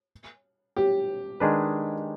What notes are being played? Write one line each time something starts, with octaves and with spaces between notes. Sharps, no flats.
G4
D#3 G#3 D4 G#4 B4